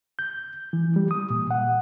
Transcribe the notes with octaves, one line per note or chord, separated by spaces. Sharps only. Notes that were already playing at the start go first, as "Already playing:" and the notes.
G6
E3
G3
D#6
A#2
F#5